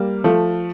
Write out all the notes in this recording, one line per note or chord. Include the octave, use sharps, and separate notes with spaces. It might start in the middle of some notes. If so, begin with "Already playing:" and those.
Already playing: G3 A#3
F3 A3